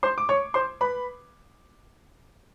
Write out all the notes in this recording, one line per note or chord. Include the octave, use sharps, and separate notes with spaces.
C5 C6
D6
C#5 C#6
C5 C6
B4 B5